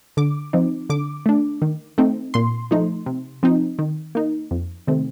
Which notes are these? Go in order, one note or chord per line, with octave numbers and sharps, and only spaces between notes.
D3 D6
F3 C4 D#4
D3 D6
A3 D4
D#3
A3 C4 D#4
A#2 C6
F3 A3 D#4
C3
F3 C4 D#4
D#3
A#3 D#4
F2
C3 D#3 A3 C4